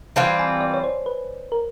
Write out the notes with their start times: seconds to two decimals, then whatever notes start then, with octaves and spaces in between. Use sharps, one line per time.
0.16 E3 G3 C4 F4 A5
0.39 G#5
0.61 D5
0.74 C#5
0.84 C5
1.06 B4
1.52 A#4